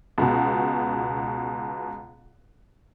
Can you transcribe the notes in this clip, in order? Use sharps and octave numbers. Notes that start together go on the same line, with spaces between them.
C#2 B2